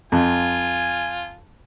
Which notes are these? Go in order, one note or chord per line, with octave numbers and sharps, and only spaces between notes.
F2 F4 G#5